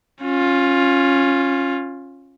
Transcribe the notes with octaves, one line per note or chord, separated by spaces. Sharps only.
C#4 F4